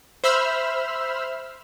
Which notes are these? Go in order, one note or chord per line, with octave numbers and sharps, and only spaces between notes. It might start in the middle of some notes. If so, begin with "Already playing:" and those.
C5 E5 B5 E6 F6